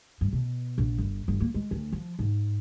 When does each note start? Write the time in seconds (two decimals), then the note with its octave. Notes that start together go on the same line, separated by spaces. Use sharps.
0.21 G2
0.33 B2
0.78 A#1
0.98 G1
1.28 G1
1.41 A#3
1.54 G#3
1.71 D2
1.92 F3
2.19 G#2